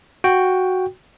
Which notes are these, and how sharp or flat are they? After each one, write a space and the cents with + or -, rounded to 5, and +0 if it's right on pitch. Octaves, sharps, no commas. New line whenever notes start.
F#4 +0 G5 +0